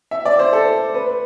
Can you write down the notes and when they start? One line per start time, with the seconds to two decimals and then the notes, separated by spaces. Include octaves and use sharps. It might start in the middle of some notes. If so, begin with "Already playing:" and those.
0.11 E5
0.25 D5
0.39 C5
0.53 A4
0.94 B4